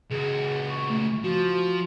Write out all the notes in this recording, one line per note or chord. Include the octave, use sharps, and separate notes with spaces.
C#2 F#4 G#4
C#6
A3
F3 F#4